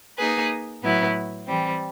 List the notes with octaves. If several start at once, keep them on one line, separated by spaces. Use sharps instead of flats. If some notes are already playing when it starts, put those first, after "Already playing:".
A#3 D#4 G#4 B4
A2 F#3 B3 E4
E3 G3 C4